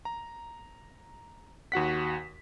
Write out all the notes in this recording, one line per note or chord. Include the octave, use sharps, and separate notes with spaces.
A#5
D#2 F#4 F#5 B6